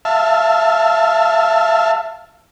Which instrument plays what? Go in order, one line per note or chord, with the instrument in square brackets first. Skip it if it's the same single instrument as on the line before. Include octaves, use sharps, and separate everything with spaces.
[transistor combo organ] E5 F5 A5